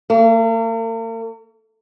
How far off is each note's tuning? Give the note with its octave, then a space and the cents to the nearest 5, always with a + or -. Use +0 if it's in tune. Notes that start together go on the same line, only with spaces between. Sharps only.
A#3 -45